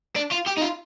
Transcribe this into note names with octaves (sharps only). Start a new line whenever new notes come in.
D4
F4
G4
D#4
F4